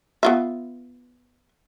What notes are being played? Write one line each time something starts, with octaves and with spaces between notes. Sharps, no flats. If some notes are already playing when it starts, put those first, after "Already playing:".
B3 F4 E5